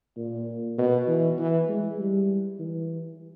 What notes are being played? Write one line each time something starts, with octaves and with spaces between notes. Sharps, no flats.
A#2
B2
E3
E3
G#3
G3
E3